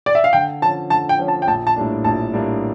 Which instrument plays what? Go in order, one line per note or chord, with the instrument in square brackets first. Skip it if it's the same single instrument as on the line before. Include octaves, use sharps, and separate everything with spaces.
[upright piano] D5
E5
F5
[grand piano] D3 [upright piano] G5
[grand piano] F3 C#4 [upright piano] A5
[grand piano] D3 [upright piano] A5
[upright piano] G5
[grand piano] F3 C#4
[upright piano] A5
G5
[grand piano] A#1 [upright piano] A5
[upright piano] A5
[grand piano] A2 G3 A#3 D4
[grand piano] A#1 [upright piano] A5
[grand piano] A2 G3 A#3 D4